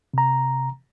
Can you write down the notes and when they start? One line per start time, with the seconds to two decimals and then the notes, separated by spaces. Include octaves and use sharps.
0.14 C3 A#5